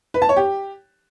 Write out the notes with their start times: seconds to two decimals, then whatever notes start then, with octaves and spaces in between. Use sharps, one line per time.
0.14 B4
0.22 A5
0.29 C#5
0.36 G4